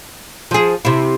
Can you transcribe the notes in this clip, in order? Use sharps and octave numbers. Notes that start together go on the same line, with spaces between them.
F3 G#4
C3 E4